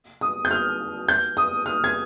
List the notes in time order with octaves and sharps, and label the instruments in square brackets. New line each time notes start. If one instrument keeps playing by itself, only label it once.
[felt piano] D#6
G6
F6
G6
D#6
F6
G#6